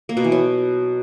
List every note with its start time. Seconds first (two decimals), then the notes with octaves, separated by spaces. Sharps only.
0.09 A#3
0.17 B2
0.24 E3
0.32 F#3